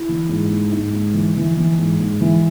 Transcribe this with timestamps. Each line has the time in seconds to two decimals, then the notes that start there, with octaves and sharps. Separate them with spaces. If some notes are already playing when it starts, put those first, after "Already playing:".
Already playing: E4
0.09 E3
0.29 G#2
0.50 G#2
0.72 G#2 D#4
0.93 G#2
1.14 E3
1.36 E3
1.57 E3
1.79 G#2
1.99 G#2
2.21 E3